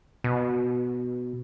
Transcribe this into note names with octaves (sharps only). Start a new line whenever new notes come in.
B2